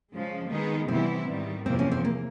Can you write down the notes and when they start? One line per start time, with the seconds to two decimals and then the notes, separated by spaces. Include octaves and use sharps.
0.11 C#3 F3 G#3
0.49 D#3 G#3 B3 D#4 G#4
0.88 C3 E3 G3 B3 C4 E4
1.27 G#2 D#3 G3
1.66 E2 C3 F3 A#3 C4
1.79 C#4
1.91 C4
2.05 A#3